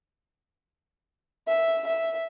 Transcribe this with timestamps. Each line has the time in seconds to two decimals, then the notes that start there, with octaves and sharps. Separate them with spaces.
1.48 E5
1.87 E5